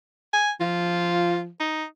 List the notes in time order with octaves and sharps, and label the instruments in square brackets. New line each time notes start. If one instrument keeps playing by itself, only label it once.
[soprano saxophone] G#5
[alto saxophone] F3 [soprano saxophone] F4
[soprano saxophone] D#4